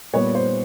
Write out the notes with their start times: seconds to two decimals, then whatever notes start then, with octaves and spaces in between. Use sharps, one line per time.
0.13 A#2 G3 B3 C#5
0.35 C5